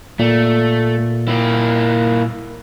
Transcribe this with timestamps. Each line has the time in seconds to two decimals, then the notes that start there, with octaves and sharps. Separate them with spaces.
0.19 A#2 A3
1.28 A#3 E4